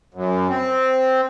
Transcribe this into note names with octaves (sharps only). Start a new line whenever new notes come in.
F#2
C4